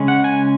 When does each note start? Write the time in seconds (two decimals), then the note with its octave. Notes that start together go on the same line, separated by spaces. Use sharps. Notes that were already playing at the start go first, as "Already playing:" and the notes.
Already playing: C#3 G#3 C#4
0.08 F#5
0.24 G#5